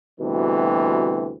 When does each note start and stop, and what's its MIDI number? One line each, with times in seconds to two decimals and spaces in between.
0.19 1.31 38
0.19 1.31 47
0.19 1.31 52
0.19 1.31 55
0.19 1.31 60